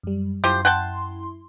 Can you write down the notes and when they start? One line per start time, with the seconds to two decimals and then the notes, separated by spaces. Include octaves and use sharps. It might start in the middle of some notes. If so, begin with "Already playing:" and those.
0.03 F#2 G3
0.44 F#2 F3 E4 G4 C5 C6
0.65 F#5 G5 A5